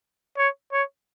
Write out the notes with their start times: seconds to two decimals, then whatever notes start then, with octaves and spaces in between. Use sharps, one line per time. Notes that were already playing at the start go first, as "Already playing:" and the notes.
0.38 C#5
0.72 C#5